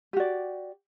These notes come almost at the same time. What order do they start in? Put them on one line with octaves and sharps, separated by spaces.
G4 F#4 D5